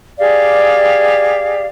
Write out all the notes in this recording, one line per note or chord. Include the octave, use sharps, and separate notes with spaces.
G4 G#4 D5 F5